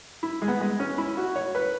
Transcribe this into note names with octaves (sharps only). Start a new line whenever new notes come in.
E4
G#3
B3
G#3
C#4
E4
F#4
C#5
B4